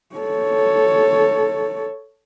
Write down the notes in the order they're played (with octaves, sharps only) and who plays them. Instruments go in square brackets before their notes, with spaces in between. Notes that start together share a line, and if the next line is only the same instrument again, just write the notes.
[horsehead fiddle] A4 C#5